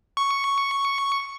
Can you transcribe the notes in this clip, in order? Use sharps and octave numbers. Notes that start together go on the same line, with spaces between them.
C#6